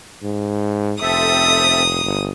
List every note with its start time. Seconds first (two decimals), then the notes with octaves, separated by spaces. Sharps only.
0.23 G#2
1.02 F1 C4 A4 E5 D#6
2.03 G1